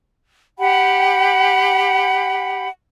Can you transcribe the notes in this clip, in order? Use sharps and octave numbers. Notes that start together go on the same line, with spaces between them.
G4 F#5 G5 B5